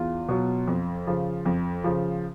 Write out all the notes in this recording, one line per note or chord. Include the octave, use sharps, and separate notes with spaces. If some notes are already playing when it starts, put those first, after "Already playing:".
Already playing: E2 F4
B2 F#3
F2
C#3 F3
F2
C#3 F3